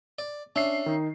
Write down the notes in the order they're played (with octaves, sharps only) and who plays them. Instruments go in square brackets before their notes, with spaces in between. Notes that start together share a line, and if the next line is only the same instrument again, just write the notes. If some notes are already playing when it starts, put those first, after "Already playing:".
[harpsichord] D5
[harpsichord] C#4 E5 [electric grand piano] D4 C7
[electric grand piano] D#3 D#4